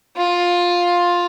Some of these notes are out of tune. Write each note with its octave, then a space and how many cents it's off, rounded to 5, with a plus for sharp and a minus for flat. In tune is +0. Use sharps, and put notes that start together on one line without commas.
F4 +10